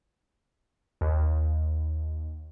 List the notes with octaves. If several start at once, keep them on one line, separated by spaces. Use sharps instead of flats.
D#2